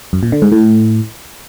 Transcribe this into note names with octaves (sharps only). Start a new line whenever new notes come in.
F#2
A#2
D3
G#2
A2